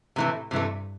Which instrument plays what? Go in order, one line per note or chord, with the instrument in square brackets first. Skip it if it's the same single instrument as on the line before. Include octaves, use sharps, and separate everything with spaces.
[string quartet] A2 [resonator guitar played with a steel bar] C3 E3 A3
[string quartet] G2 [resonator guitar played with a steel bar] C3 E3 A3